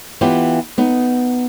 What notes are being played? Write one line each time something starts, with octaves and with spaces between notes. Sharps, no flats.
E3 B3 F4 G4
B3 D#4